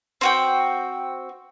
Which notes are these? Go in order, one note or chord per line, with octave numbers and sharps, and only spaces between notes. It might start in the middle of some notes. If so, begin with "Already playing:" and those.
C4 F#4 G5